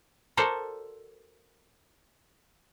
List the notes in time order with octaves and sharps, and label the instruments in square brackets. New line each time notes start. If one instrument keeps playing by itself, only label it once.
[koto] F#4 A4 A#4 C5 D5